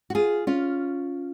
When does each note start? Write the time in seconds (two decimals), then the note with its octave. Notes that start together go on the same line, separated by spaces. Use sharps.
0.10 F#4
0.15 F4 G#4
0.47 C#4 F4